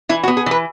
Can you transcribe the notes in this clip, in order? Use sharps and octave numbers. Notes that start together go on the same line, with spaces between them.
E3 E4
F#4
B3
G#4
E3 B4